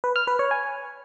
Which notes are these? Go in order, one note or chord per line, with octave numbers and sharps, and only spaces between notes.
B4
F6
B4
C#5
G#5